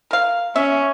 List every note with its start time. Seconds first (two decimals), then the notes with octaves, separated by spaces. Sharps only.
0.11 A#4 F5
0.56 C#4 E5